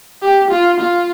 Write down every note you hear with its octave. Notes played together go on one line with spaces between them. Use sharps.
G4
F4
F4